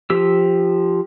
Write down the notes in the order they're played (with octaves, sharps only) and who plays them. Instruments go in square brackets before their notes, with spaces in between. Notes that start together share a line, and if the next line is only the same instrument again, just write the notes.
[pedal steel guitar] F3 G4 E6